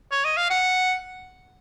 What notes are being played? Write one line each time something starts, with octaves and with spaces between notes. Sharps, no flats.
C#5
D#5
F5
F#5